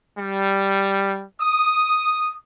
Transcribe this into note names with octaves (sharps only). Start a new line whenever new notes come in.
G3
D#6